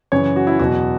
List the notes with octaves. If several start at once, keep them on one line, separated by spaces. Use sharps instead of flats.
F#2 C#3 E3 C#5
F#4
E4
E2 B2 F#3 F#4